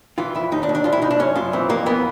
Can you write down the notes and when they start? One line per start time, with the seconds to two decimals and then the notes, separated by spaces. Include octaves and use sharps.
0.18 E3 F4
0.35 F2 E4
0.52 D#2 D#4
0.63 D4
0.69 D#2
0.75 D4
0.84 C2 F4
0.92 E4
1.02 C2 D#4
1.10 D4
1.19 F#2 C#4
1.35 F#2 F4
1.53 E3 C4
1.69 F2 A#3
1.86 E3 B3